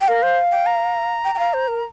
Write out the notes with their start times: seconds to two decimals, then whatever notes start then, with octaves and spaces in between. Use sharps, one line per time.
0.01 G5
0.08 A#4 F5
0.23 C5
0.52 G5
0.66 A#5
1.24 G5
1.35 G5
1.39 F5
1.54 C5
1.68 A#4